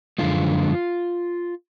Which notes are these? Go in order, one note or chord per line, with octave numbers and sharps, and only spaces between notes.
F#2 D3 F3 G#3 F4